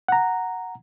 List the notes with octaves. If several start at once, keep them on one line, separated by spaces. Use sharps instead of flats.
F#5 A#5